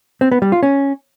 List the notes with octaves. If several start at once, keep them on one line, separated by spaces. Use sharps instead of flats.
C4
B3
G3
F4
C#4